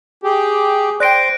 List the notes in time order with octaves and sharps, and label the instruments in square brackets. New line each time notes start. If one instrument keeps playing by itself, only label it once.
[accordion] G4 [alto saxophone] G#4
[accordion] C5 [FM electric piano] D5 G5 [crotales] F#6 A#6 D7